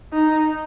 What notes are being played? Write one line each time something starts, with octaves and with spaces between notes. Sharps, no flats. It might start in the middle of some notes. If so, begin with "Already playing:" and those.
D#4